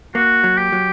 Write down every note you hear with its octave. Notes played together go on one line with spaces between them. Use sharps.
A#3 F#4
F#3
G4
F#3